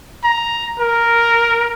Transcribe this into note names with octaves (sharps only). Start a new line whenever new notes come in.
A#5
A#4